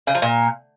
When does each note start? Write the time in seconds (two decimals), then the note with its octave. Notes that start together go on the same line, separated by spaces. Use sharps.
0.07 C#3
0.15 F3
0.22 A#2